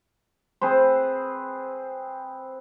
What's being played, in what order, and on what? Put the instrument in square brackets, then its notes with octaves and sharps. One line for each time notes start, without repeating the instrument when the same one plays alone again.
[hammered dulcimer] C4 G#4 B4 C5